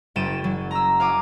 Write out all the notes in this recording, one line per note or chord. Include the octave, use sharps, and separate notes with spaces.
F#1 C#4 G5 A6 D#7 E7
F#3
A#5 E6
F5 G#5 D6